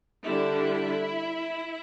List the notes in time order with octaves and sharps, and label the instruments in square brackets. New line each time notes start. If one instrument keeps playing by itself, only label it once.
[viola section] D3 G3 D4 E4